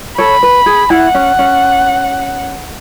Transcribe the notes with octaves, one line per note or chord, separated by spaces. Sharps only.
A4 C#5 B5
B4
G#4
E4 F#5
C#4
C#4